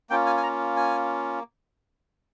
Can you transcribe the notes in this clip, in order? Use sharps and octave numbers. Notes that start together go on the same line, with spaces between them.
A#3 C#4 F4 G5
G#5
G#5
A#5
G#5